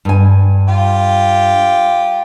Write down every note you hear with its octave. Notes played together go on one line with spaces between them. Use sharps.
G2 G#5
F4 G4